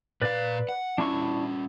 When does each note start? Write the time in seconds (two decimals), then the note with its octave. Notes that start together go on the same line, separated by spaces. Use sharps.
0.22 A#2 B4 D5 F5
0.69 F#5
0.98 G3 C#4 D4 E4 C#6